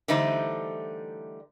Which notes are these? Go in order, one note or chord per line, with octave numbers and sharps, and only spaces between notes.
D3 E3 G3 A3 D#4 C5